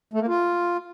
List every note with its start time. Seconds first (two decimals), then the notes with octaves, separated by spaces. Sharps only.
0.14 A3
0.21 A#3
0.28 F4